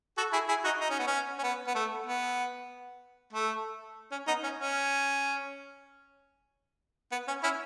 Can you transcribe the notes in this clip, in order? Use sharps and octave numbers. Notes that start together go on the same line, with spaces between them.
F#4 A4
E4 G#4
E4 G#4
D#4 F#4
D#4
C#4
B3
C#4
C#4
B3
B3
A3
B3
A3
C#4
B3 D#4
C#4
C#4
B3
C#4
C#4 E4